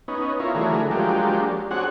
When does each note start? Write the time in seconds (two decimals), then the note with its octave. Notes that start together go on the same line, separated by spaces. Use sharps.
0.08 B3 C#4 D#4
0.40 E4 F4 A#4 C#5
0.55 D3 E3 F#3 A3 G#4 A#4
0.91 F3 F#3 G#3 A#3 D4 G4
1.71 C4 D4 F#4 G#4 C#5 F#5